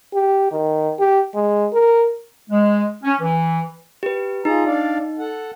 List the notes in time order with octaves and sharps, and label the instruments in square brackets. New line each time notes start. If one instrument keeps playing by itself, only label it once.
[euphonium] G4
D#3
G4
G#3
A#4
[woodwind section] G#3
C#4
E3
[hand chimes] G4 B4
[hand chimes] D#4 [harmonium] F4 G#4 A#5
[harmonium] D4 D5 F5
A4 F#5